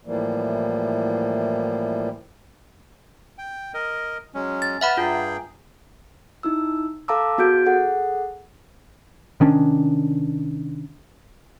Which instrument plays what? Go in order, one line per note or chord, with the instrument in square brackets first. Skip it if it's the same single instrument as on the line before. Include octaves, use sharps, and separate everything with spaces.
[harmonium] A2 E3 F3 G3 A#3
[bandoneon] G5
A#4 D#5
F#3 G#3 C#4
[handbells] A6
[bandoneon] B4 F6 [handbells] E5 F#5 B5
[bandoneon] G2 G#4 G5 [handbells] F4
[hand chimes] D#4 E4 E6
A4 F5 A5 A#5 D6 E6
B3 F#4 G#4 G6 D7
G#4 A4 F#5
[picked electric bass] C3 D#3 C#4 D4